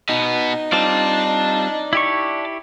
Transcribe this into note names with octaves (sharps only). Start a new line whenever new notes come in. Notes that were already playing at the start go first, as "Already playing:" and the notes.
B2 B3 D#4
G3 C4 F4 D5 A5
E4 G4 C#6